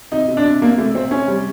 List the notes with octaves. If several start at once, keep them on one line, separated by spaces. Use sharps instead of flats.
C3 D#4
C3
D4
C3
C3 A#3
C3 A3
C3 C4
C3 C#4
G3